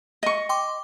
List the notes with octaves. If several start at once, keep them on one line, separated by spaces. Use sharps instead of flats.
D#5 C#6
G5 C6 D6